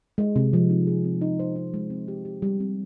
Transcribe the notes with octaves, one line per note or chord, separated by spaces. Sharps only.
G#3
C3
F3
D#4
G#4
C4
D#4
C5
D#4
G#3
C4
G4
G4
G3
C4